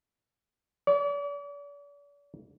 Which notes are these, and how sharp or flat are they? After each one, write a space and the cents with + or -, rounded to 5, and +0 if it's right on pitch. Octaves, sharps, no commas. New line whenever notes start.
D5 -40